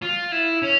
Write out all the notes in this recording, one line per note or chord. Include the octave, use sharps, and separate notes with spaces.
F4
E4
C#4